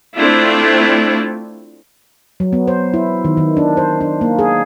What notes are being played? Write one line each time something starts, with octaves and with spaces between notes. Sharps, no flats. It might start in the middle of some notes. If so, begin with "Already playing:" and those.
A3 C4 D4 E4 F4
F#3
B3
C5
E4
D#3
D#3
D4
C5
D4
A#3
G#4